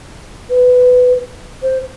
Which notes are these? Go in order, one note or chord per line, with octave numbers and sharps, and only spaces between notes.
B4
C5